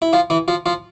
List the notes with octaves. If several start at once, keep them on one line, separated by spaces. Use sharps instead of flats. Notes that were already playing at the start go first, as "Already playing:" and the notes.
E4
F3 F4
E3 E4
F3 F4
F3 F4